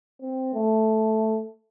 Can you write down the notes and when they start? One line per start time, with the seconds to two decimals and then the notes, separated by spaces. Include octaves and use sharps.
0.22 C4
0.54 A3